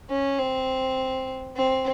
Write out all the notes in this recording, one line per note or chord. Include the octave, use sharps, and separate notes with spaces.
C#4
C4
C4